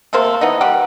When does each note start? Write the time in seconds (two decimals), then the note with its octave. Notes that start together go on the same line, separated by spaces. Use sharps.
0.13 C3 A3 A#3 C5
0.41 E3 B3 D#4
0.61 G3 G4 F#5